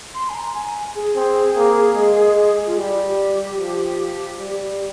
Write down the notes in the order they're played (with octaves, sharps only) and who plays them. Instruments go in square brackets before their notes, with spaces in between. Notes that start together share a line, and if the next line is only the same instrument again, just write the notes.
[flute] C6
G#5
A#5
G#5
G#4
[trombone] C4
A#3
G#3
[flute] F4
[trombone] G3 [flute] G4
[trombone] F3
G3